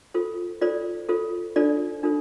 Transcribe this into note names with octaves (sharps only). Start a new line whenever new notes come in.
F4 A4 C5
F4 A4 C5 D5
F4 A4 C5
D4 F4 A4 C5 D5
D4 F4 A4 C5